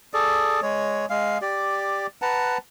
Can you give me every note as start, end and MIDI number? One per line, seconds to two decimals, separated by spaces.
0.14 0.60 68
0.14 0.60 69
0.14 0.60 74
0.62 1.06 56
0.62 1.06 73
1.10 1.38 56
1.10 1.38 77
1.42 2.07 67
1.42 2.07 74
2.22 2.58 71
2.22 2.58 78
2.22 2.58 81
2.22 2.58 82